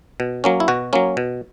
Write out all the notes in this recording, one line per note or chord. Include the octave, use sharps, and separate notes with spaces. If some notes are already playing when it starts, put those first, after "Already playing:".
B2
F#3 A#3 C#4
E4
B2 F#4
F#3 A#3 C#4
B2